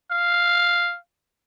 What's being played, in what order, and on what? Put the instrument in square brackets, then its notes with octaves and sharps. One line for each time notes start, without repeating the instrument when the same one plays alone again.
[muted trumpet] F5